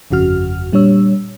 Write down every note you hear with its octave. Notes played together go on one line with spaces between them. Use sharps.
G1 F2 C#3 F#4 F6
A#2 G3 D4 C#5 E6